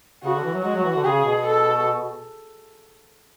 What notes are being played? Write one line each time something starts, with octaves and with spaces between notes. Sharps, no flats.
C#3 F#4
D3
E3
F#3
G#3 F#4
F#3
E3
D3
C#3 G#4
B2
A4